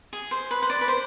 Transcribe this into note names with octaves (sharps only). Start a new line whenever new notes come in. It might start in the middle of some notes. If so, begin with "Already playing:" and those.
G#4
C5
B4
C5
D5
B4
C5